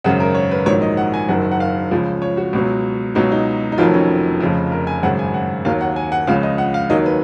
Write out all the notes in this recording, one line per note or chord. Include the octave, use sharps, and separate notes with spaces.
G#1 F#2 C#3 F#5
A#4
C#5
B4
A#1 G#2 D#3 F#3 C#5
D#5
F#5
G#5
F#1 F#2 D#3 F#3 F#5
F#5
F5
C#2 C#3 F3
C#5
F#4
C#2 B2 F#3
C#2 B2 F#3 D#4
D#4
D#4
F1 F2 D#3 F#3 F4
C#4
F1 F2 C#3 F3
A#4
G#5
G#1 F#2 C#3 F#5
G#5
F#5
D#2 D#3 F#3 F5
F#5
G#5
F#5
C#2 C#3 F3 F5
D#5
F#5
F5
D#2 D#3 F#3 D#5
B4